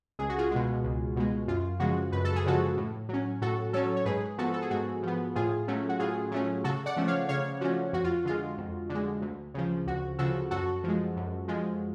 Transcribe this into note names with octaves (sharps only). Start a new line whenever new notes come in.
C#2 G#4
F#4
F4 G#4
B2 G#3
C#2
B2 G#3
F#2 F4
C#3 F3 G#3 F#4
F#2 B4
A4
G#4
C#3 F3 G#3 F#4 A4
A2
F#3 C#4
A2 F#4 A4
F#3 C#4 A4 C#5
C#5
G#2 G#4 B4
F3 B3 F#4 A4
A4
G#4
G#2 F#4
F3 B3
A2 F4 G#4
F#3 A3 C#4
F#4
A2 F4 G#4
F#3 A3 C#4
C#3 F#4 A4
D5 F#5
F3 A3 C#4
C#5 F5
C#3 C#5 F5
F3 A3 C#4 F#4
F2 F#4
F4
D3 G#3 F4
F2
D3
G#3
D2
C#3 F3
D2 F#4
C#3 F3 F#4 A4
F#2 F#4 A4
F3 G#3
F#2
F3 G#3